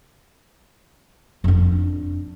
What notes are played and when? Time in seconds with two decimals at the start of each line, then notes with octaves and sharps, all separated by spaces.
1.44 F2 D4